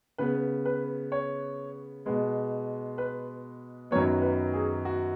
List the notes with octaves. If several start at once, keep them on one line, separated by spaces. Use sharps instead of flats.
C#3 B3 B4
B4
C#5
B2 G#3 B3
B4
F#2 D#3 F#3 B3 C#5
B4
G#4
F#4